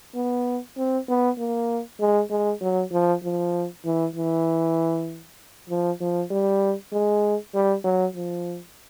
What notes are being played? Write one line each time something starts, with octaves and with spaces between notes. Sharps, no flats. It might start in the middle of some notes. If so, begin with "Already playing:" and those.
B3
C4
B3
A#3
G#3
G#3
F#3
F3
F3
E3
E3
F3
F3
G3
G#3
G3
F#3
F3